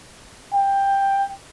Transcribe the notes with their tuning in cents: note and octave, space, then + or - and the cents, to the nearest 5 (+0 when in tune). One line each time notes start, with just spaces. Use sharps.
G5 +10